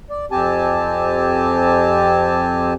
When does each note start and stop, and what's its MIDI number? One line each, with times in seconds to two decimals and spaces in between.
0.10 0.26 74
0.31 2.74 41
0.31 2.74 60
0.31 2.74 67
0.31 2.74 80
0.31 2.74 81